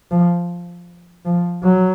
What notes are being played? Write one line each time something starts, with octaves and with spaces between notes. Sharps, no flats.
F3
F3
F#3